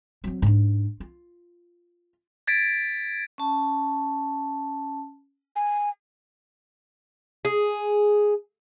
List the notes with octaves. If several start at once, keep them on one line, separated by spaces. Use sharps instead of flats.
F#3 C4
G#2 D4
F4
G#6 A6 B6 D7
C#4 A5
G#5
G#4